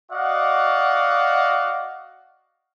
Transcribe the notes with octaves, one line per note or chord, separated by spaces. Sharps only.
F#4 D5 D#5 F5 F#5